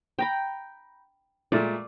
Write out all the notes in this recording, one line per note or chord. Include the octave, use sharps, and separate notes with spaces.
G5 A#5 B5
A#2 G#3 A3 D5